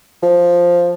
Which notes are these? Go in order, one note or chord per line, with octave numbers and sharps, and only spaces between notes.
F3